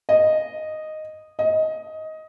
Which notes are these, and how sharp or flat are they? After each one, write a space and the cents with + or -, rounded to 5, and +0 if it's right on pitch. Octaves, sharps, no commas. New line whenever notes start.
D#5 -5
D#5 +15